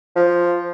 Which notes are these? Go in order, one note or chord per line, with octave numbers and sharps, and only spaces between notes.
F3